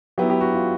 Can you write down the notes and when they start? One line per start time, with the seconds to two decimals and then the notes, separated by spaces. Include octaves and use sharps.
0.18 F#3 B3 E4 G4
0.30 G4
0.41 F#4
0.55 F4